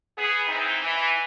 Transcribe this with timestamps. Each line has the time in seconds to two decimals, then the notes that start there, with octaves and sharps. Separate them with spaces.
0.17 B3 G#4
0.47 E3 C4 D#4
0.83 E3